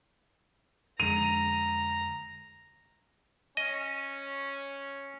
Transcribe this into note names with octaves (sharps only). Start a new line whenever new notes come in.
F2 D3 G#3 A#5 D#7 F7
C#4 D#5